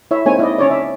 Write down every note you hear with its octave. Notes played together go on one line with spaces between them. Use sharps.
E4 C#5 E5
G#3 A#3 C4 D#4 C#5 G#5
E4 D5 D#5
C#4 C#5 D5
E5